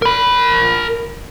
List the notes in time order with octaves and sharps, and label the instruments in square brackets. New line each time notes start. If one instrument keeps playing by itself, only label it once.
[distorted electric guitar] A#4 B5